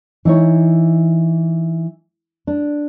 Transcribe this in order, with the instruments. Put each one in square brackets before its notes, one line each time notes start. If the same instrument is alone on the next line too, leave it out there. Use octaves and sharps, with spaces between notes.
[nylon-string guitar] E3 D#4 C#5
D4